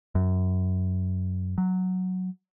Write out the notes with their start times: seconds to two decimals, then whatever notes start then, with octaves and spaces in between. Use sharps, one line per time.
0.15 F#2
1.58 F#3